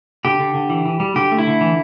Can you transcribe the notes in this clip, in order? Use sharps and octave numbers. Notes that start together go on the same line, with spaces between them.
D3 G4
D3
D3
E3
E3
G3
D3 G4
A3
E4
D3
E3